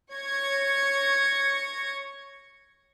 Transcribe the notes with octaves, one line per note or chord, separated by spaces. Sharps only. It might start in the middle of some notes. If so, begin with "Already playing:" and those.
C#5 C#6 G#6 A#6 C#7